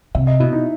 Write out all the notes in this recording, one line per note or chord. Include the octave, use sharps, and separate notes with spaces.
C3 E5
D#5
B2 E4
D#4